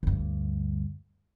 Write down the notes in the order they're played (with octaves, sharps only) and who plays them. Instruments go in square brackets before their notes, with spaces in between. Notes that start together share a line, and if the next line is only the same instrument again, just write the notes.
[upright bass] D2 G2